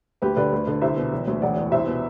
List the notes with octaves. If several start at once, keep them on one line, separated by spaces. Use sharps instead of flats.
D2 G4 B4
D3 B4 D5
D2
D3
C2 C5 E5
B2
E1
D2
E1 D5 F#5
E2
C2 C5 E5
B2